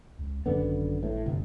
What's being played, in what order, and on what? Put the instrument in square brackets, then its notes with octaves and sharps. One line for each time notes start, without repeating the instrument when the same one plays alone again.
[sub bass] C#2
[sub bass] G#1 [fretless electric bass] F#2 D3 B3
[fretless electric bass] A2
[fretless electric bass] G1 [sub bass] C3